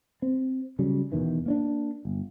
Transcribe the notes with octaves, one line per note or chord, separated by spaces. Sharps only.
C4
C#3 F#3 G3
E2 B2 D#3 E3
A#3 C#4 D4
G1